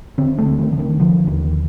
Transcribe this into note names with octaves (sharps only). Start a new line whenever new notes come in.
D3 C4
A3
D2
D#3
D3
D#3
D3 F3
D#2 D#3